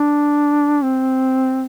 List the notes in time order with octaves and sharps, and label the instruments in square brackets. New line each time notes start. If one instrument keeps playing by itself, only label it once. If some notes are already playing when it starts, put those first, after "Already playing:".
Already playing: [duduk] D4
C4